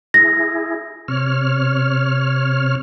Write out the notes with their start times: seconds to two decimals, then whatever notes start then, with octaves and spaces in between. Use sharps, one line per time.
0.14 E4 G#4 A#6
1.08 C3 C#5 F6